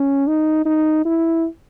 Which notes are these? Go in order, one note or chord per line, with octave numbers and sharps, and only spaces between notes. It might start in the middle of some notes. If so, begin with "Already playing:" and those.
Already playing: C#4
D#4
D#4
E4